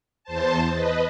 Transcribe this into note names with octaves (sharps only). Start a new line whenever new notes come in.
E2 C5 A5
B4 D#5